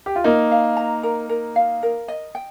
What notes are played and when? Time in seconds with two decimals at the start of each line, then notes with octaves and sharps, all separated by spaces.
0.06 G4
0.16 F4
0.24 A#3 D#4 A#4
0.51 F5
0.77 A#5
1.03 A#4
1.29 A#4
1.56 F5
1.83 A#4
2.08 D#5
2.35 G5